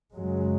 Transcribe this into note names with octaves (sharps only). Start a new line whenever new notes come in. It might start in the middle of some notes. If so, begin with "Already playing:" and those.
F#2 C#3 F#3 G#3